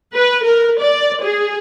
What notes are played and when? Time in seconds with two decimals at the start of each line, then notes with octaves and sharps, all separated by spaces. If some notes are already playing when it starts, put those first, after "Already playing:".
0.14 B4
0.44 A#4
0.79 D5
1.23 G#4